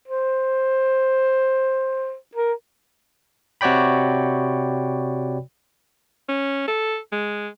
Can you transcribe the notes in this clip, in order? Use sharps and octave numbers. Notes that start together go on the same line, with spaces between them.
C5
A#4
C3 F#4 C#5 D5 G5 B5
C#4
A4
G#3